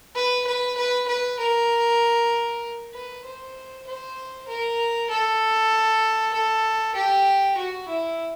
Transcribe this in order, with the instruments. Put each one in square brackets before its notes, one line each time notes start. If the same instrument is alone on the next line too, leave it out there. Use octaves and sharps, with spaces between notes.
[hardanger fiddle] B4
B4
B4
B4
A#4
B4
C5
C5
A#4
A4
A4
G4
F#4
E4